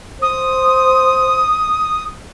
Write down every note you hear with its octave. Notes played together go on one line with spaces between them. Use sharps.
C5 D#6